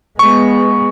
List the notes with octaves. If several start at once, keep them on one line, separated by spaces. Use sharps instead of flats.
G#3 B3 C#6